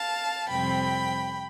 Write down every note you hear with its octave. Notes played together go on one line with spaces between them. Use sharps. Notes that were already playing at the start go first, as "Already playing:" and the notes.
Already playing: F5 A5
F2 C3 G3 C4 G5 B5